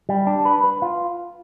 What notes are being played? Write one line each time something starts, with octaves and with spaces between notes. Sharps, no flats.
G3
D4
B4
B4
F4